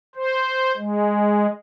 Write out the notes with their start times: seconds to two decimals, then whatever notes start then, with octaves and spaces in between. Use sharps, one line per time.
0.16 C5
0.77 G#3